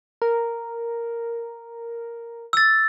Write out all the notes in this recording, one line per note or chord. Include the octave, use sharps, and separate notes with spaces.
A#4
E6 A6